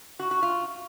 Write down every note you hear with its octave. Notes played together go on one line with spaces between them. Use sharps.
F#4
F#4
F4